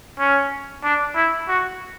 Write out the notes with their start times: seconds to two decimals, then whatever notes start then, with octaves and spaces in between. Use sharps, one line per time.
0.18 C#4
0.84 D4
1.15 E4
1.48 F#4